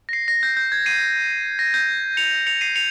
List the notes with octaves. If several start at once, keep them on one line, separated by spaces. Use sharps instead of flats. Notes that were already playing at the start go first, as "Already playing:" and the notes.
A#6
C7
A#6
G6
G6
G#6
C7 D#7
A#6
G6
C#7 F7
C#7 F7
C7 D#7
C#7 F7